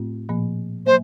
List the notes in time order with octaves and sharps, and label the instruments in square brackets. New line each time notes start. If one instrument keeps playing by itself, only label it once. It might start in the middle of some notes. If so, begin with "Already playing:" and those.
Already playing: [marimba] A2 A3 C4 F4
A#2 F3 A#3
[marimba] F#3 A#3 [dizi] C5